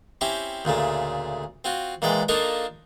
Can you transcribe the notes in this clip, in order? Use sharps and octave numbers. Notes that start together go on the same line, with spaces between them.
C4 C#4 E4 G4
D2 A#2 C#3 A3
C4 F4 F#4
A#2 E3 G#3 D5 G5
A#3 D4 D#4 F4 A4 A#4